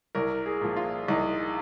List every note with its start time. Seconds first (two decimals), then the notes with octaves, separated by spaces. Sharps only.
0.15 C2 A#4
0.46 G#4
0.61 A#2 F3
0.76 F4
1.08 C2 D#4